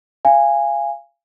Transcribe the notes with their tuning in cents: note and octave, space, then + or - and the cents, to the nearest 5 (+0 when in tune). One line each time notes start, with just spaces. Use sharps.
F5 -25 G#5 -15